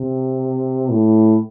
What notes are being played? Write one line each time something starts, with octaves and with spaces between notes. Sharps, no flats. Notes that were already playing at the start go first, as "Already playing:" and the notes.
Already playing: C3
A2